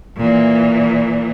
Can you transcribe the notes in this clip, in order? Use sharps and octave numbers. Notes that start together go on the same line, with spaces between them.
A#2 E3